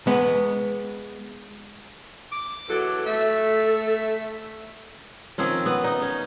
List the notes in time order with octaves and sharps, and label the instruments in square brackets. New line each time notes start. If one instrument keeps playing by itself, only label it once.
[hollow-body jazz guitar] G#3 B3
[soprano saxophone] D6
[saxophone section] E2 F#3 A4
[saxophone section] A3 [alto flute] A4 [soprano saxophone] E5
[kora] D#3 F3 C4 C#4
B3
D#4
C#4